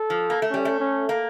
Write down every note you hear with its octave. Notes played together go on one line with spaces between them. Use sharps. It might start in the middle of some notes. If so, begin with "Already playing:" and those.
Already playing: A4
F3
A#3
A3
G3 C#4
A3
C#4
A#3